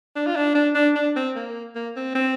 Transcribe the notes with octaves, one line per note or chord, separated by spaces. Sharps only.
D4
F4
D4
D4
D4
D4
C4
A#3
A#3
C4
C4